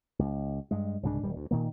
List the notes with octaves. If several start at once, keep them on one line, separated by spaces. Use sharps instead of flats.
C#2
G2 G#3
C2 G#2 C#3 D4
D#1 G3
D2
A#2 D#3 A#3